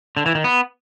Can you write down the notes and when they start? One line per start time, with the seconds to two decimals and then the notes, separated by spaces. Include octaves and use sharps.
0.17 D3
0.26 E3
0.35 D#3
0.44 B3